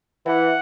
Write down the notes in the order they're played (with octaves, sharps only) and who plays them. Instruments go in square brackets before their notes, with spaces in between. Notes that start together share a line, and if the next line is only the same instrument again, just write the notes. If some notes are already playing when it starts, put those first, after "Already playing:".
[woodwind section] E3 [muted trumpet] F#5